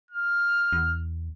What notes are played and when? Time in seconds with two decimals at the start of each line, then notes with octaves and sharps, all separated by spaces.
0.11 F6
0.73 E2